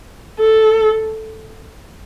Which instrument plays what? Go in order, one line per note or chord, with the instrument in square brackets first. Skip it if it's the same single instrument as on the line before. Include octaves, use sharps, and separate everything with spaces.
[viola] A4